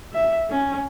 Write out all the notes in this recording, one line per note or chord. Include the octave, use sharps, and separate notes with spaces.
E5
C#4